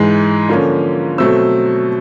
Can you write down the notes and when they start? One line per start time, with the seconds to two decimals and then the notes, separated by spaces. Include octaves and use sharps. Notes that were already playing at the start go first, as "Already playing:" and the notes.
Already playing: G#2 E3 G#3
0.49 D3 F3 A#3 C#4
1.18 B2 F#3 A3 C4 E6